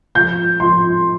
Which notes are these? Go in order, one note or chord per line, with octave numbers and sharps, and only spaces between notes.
F3 G6
F3 C6